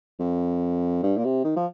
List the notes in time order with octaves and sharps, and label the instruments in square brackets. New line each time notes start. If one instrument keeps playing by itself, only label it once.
[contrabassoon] F2
G2
A#2
C3
D#3
F3